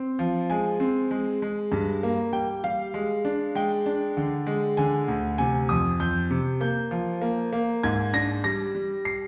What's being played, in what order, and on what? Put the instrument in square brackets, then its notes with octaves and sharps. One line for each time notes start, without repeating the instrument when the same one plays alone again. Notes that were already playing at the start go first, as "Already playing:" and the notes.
Already playing: [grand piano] C4
F3
G#3 G#5
C4
G#3
G#3
G2
A#3
G3 G5
G3 F5
G#3
D4
G#3 G5
D4
D3
G#3
D3 G#5
D2
C3 G#5
F2 D#6
F2 G6
C3
A#3 G6
F3
A#3
A#3
G#2 G#6
D4 A#6
G3 A#6
G3
C7